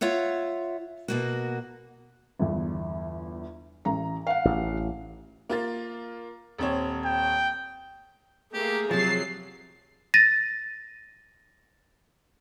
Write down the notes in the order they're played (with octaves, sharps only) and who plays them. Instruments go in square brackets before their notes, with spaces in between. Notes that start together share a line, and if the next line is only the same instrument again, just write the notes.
[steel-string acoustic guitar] F4 C#5 E5 F#5
B2 A#3 F#4
[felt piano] G1 E2
A1 A#5
F5 F#5
[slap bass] A1
[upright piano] A#3 F4 A6
D#1 C4 C#5
[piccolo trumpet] G5
[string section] A3 A#3 [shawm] G4 [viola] G#4
[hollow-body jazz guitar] C3 F3 [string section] F#3 C7 [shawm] A5
[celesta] A6 A#6 D#7